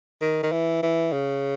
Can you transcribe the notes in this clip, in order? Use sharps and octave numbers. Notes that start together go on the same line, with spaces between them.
D#3
D#3
E3
E3
C#3